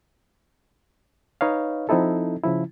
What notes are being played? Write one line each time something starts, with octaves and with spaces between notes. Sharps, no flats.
D#4 B4 C#5 D#5 F5
F3 C4 D#4 E4 A4
C#3 F3 E4